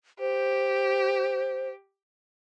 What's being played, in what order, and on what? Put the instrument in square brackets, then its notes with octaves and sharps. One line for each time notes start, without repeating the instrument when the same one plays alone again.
[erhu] G4 [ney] C5